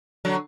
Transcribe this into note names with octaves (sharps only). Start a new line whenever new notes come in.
D3 F#3